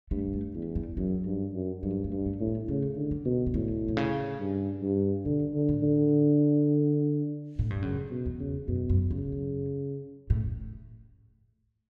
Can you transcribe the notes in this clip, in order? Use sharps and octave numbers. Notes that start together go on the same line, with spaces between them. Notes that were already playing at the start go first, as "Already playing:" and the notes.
G2 A3
A3
E2 G3
G3
F#2 F#3
G2
F#2
G2 F#3
A3
G2
A3
A2
B3
C#3 A3
D3
G3
B2
C#3
A2 D3
B2
C#3
G2
G2
B2 D3
D3
A2
D3
A2
G2
F#2 C#3
B2
E2
C#3
F#2 B2
F#2
G2 C#3
F#2
A2